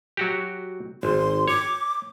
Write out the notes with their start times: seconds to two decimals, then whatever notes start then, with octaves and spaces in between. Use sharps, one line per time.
0.17 F#3 F#4 G4
1.03 G#1 C6
1.48 C#5 D6